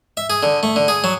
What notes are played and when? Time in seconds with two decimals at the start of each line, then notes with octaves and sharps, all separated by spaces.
0.17 E5
0.30 G#4
0.43 D3
0.63 A3
0.76 D3
0.88 G#4
1.04 F#3